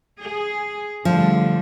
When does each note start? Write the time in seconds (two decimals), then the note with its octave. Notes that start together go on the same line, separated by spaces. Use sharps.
0.19 G#4
1.05 A2 D3 F3 G3